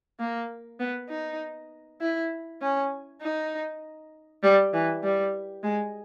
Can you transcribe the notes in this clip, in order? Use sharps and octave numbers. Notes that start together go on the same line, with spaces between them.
A#3
B3
D#4
E4
C#4
D#4
G3
E3
G3
G#3